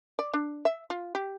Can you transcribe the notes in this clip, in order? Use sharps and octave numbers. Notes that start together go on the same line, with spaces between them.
D5
D4
E5
F4
G4